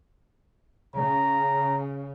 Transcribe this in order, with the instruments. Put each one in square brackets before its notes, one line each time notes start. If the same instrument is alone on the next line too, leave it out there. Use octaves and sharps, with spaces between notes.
[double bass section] C#3 [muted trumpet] A#5